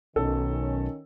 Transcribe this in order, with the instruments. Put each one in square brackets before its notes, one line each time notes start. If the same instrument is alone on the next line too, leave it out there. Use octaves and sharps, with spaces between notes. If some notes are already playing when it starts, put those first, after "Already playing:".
[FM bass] B1 [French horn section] D#3 C#4 [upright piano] A4